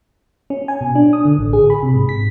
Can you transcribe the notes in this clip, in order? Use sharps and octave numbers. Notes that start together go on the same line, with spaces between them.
C#4
G#5
B2
D4
D#6
D3
A1
G#4
B5
C3
G#2
B6